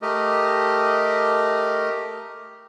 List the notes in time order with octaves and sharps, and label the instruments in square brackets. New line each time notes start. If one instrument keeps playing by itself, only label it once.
[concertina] A3 G4 A#4 D#5